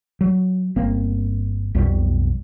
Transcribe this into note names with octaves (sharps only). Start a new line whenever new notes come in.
F#3
G1 A#3 C4
B1 F2 B2 G3